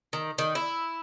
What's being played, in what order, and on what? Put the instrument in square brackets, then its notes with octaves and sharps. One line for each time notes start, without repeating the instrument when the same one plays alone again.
[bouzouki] D#3
D#3
E4